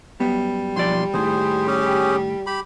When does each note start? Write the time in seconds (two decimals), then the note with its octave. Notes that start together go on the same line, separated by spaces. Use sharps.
0.20 F#2 G3 B3
0.76 B1 F3 D5 C6
1.14 D#2 A2 C#3 G#4 C5
1.67 C#4 G4 G#4
2.47 G4 B5